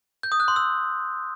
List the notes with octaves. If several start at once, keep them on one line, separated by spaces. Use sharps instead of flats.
G6
D#6
F#6
C6
E6